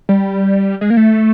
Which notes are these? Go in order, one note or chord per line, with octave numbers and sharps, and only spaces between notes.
G3
G#3
A#3
A3